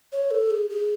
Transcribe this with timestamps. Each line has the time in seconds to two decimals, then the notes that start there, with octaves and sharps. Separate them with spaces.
0.12 C#5
0.31 A4
0.51 G#4
0.70 G#4